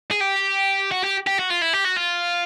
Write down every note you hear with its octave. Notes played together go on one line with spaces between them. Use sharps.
G#4
G4
F#4
G4
G4
F#4
F4
E4
G4
F#4
F4